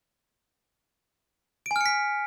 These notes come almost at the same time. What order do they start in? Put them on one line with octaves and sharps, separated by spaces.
D7 G#5 F6 C#7 B6